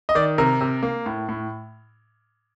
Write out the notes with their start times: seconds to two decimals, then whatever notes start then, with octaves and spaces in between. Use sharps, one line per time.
0.09 D#5
0.15 D#3 D5
0.38 C3 A#4
0.61 C3
0.83 A#3
1.06 A2
1.29 A2